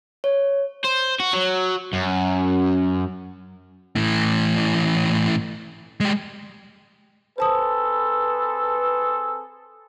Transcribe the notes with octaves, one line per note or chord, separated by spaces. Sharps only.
C#5
C5
F#4
F#3
F#2
A2 E3
G#3 G4
C4 G#4 A4 B4 C5 A5 D#6